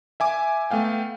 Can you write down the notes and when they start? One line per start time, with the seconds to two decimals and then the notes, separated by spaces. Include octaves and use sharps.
0.20 E5 G#5 D6
0.71 A3 B3 F5 G5